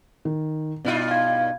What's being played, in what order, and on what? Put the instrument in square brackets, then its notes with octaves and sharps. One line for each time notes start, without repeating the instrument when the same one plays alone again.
[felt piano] D#3
[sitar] G2 D#4 F4 [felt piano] B2
[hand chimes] F5 G#6